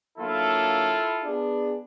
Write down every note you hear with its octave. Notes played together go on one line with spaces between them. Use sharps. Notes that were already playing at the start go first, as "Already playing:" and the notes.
D3 F#3 A#3 E4 F4 A4
B3 D4 G#4